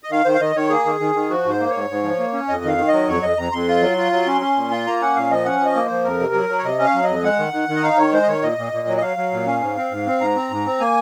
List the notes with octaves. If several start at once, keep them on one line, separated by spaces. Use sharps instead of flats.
D#5
D#3 F5
D#3 C5
F5
D#3 D#5
D#3 C#5
A#3 G#4
D#3
D#3
D#3
F3 F#4
G#2 C5
A#3
G#2 C#5
G#2
F3
A#3
C#4
F2 D#5
D#3 F5
D#3
D#5
F#3
F2 C#5
F2 D#5
F2 A#5
F2 C6
F4
F#3
F4
F#3
C#4
C#4
A#2
F4
A#3 A#5
C#4 F#5
A#2 F5
F3 D#5
C#4 F#5
F3
D#5
A#3
C5
F3
F2 A#4
C3
F#3
F#3
C#5
C3 D#5
C#4
F5
F#3
D#5
F2
G#3 F#5
D#3
D#3
D#3
D#5
D#4 F5
D#3 C#5
G#3 C5
D#5
D#3 C#5
A#2 D#5
A#2
A#2
F#3
D#5
F#3 F5
F#3
A#2
C#4
G#2
C4
G#2
C4
G#2 A#5
C4
G#2
C4
A#3 G#5